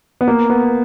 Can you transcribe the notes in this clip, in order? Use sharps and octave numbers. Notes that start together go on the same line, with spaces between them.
B3
A#3
B3